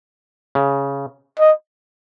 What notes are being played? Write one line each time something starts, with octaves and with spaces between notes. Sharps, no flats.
C#3
D#5